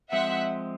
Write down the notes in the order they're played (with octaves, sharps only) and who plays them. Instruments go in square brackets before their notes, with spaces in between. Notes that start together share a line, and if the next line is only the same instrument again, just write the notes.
[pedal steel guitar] F3 G#3 C4 [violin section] E5 F#5